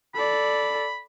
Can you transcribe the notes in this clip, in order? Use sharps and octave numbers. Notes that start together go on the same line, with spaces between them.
A4 D5 B5